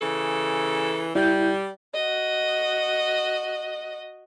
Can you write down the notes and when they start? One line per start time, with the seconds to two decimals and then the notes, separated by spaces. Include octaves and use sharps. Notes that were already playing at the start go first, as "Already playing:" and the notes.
0.02 C#3 E3 A4
1.15 G3 E4 G6
1.94 F#4 D#5